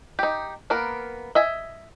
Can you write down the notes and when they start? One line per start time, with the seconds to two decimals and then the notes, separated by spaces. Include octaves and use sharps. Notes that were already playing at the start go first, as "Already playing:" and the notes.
0.19 D#4 G4
0.70 A#3 B3 A#4
1.35 D#5 E5 G#5